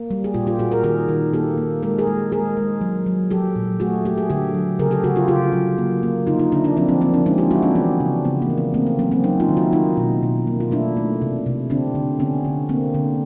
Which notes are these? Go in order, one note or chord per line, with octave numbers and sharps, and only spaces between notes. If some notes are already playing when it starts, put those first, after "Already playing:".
Already playing: A#3
G3
G#4
A#2 F4 G4
F4 G4
A#2 F#4 G#4
G#4 A#4
D#3 G#4 A#4
D#3
A#3 G4 A4
A#3
G#3 A#4
G#4 A#4
G#3
G#3 G#4 A#4
G#3
F#3
F#3
F#3 G4 A4
A#2
A3 F#4 G#4
A3 G4
G#4
D3 G4 A4
F#3
C#3 G#4 A#4
G4 A4
C#3 F#4 G#4
F4 G4
C#3 F4 G4
F#3
A#3
A#3
D3 D#4 F4
D#4 F4
D3 D4 E4
D4 E4
F3 C4 D4
C4 D4
F3 A#3 C4
C4 D4
G#3 C#4 D#4
F4 G4
G#3 E4 F#4
C4 D4
E3 B3 C#4
C#3
C#3 B3
A#3
E3
B3
A3 A#3 C4
B3
F#3 B3 C#4
A#3 C4
F#3 C#4 D#4
D#4 F4
D#3
E4 F#4
A#3 D#4 F4
B2
B2
A#3
F4
A3 D4 E4
A3
C3
C3
D3 C4 D4
D3
D3 B3 C#4
D3
D3 A#3 C4
D3